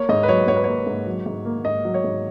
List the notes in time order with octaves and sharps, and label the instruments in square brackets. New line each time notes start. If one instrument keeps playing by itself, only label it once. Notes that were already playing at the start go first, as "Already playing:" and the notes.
Already playing: [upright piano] A#3 [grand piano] C#5
[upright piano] G#2 [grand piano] D#5
[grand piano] B4
[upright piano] F#3 [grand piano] C#5
[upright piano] G#2 [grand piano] C#5
[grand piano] B4
[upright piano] A#3 [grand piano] C#5
[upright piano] G#2
F#3
G#2
A#3
[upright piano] G#2 [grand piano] D#5
[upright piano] F#3
[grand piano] C#5
[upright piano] G#2